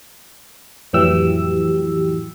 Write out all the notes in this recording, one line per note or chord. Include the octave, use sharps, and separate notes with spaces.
F2 A2 E3 F#3 G4 E6